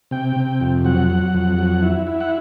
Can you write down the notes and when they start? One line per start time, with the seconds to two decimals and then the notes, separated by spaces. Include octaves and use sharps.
0.11 C3 G5
0.36 C3
0.61 F2
0.84 F#3 F#5
1.10 F#3
1.34 F2
1.59 F#3
1.82 E4
2.07 E4
2.20 F#5